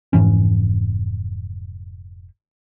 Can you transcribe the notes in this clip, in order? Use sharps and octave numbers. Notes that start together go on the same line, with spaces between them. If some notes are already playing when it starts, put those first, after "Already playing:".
F1 G#2 E3 C#4